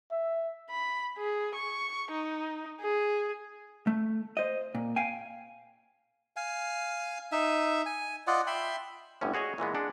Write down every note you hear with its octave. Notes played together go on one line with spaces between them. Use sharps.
E5
B5
G#4
C#6
D#4
G#4
A3
C5 D#5
A#2
F5 G5 G#5
F5 G#5
D#4 E5
G#5
F4 D5 D#5 F#5
E5 G5 B5 C6
G1 A2 D3 C#4
F#4 G#4 C#5 D#5
A#2 E3 G#3 B3
G#3 D4 F#5